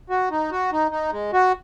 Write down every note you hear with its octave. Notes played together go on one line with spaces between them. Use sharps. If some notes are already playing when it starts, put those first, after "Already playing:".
F#4
D#4
F#4
D#4
D#4
G#3
F#4